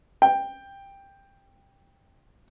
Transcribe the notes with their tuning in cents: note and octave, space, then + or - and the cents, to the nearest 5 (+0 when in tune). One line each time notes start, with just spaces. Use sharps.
G5 +10